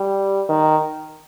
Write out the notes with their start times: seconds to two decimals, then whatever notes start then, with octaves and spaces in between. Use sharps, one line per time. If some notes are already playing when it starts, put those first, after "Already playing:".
Already playing: G3
0.49 D#3